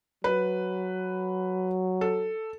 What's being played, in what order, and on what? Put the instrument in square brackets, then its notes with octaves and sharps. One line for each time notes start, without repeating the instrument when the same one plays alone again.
[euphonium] F#3 [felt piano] B4
[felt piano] A4